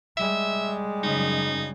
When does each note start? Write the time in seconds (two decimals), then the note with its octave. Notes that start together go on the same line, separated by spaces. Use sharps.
0.17 G3 G#3 E5
1.03 F#2 C#3 D#4